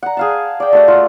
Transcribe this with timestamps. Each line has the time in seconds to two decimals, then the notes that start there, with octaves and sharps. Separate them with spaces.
0.03 F#5 A#5
0.17 G#4 F5 A5
0.60 D5 G5
0.73 A3 F#4 F#5
0.88 F4